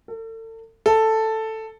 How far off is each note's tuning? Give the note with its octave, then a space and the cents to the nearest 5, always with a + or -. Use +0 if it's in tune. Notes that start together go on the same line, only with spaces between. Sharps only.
A4 +40
A4 +5